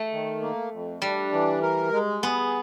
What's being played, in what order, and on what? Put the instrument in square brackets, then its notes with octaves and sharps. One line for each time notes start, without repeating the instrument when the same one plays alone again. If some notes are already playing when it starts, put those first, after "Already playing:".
Already playing: [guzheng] A3
[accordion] D#3
A#3
F2
[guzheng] G3 [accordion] D4
[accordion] E3
A#4
G#3
[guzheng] B3 [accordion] G#4